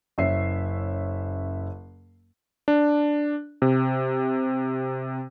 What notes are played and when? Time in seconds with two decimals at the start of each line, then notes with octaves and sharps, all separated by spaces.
0.18 F#1 C#4 E5 C7
2.68 D4
3.62 C3